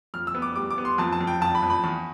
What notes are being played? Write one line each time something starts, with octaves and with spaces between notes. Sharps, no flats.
F2 F6
E6
B3
D6
G3 D6
D6
B3
C6
F2 A5
A5
F2
G5
F2 A5
B5
F2
B5
E2